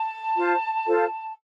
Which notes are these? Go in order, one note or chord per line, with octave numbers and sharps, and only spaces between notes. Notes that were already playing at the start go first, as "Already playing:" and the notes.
Already playing: A5
F4 C5
F4 A4 C5